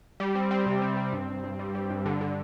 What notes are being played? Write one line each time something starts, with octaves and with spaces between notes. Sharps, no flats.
G3
C4
C4
C3
C4
C4
G2
G2
G2
G3
G3
G2
D3
D3